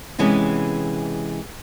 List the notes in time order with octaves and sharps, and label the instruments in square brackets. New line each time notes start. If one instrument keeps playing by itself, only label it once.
[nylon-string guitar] C3 E3 G#3 B3 C#4